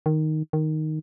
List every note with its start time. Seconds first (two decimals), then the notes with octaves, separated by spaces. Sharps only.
0.06 D#3
0.53 D#3